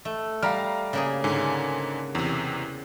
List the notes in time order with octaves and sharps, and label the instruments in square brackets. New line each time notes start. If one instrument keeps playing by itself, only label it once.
[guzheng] A3
[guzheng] G3 [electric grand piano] F5 A#5 F6
[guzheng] C#3 A#3 G#4
[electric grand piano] G#2 D3 G#5
E2 C3